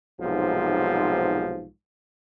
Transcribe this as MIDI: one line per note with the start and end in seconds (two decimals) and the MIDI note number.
0.20 1.66 35
0.20 1.66 44
0.20 1.66 48
0.20 1.66 53